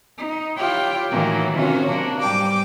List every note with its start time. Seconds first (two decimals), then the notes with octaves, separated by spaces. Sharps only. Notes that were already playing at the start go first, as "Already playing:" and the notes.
0.18 D#4
0.57 E4 F4 G4 C#5 G5
1.09 A2 D#3 E3 F#3 A#3
1.55 C3 D#3 C#4 F4 F#4
1.88 F#3 A#3 D4
2.21 G#2 G3 G5 D6